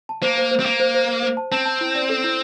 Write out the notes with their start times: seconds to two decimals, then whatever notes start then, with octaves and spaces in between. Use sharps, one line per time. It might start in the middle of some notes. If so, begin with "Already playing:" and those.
0.09 A5
0.22 A#3 C5
0.38 C5
0.51 C5
0.60 C4
0.66 A#3 F5
0.80 C5
0.95 C5
1.08 C5
1.23 C5
1.37 A5
1.52 C4 A5
1.66 A5
1.81 E4
1.95 D5
2.09 A4
2.24 E4